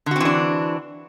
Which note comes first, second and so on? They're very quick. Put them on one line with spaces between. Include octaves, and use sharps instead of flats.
D3 F#4 C4 E3 D4